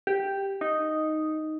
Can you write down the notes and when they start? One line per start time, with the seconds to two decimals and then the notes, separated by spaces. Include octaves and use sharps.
0.07 G4
0.61 D#4